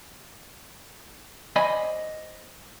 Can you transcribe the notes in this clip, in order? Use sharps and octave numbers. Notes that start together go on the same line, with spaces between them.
C5 D5 D#5 G#5 B5